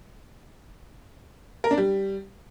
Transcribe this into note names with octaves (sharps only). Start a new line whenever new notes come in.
A#4
D4
G3